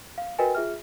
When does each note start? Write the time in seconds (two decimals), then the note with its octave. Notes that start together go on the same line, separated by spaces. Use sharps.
0.18 F5
0.39 F#4 A#4 B4 D#5 G5 G#5
0.55 F4 G#4 E5 F6